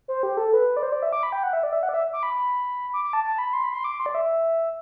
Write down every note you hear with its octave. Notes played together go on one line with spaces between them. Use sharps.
C5
G4
A4
B4
D5
C5
D5
E5
D6
B5
G5
F#5
E5
D5
E5
F#5
D5
E5
D6
B5
D6
D6
A5
A5
B5
C6
B5
C6
D6
C6
D5
E5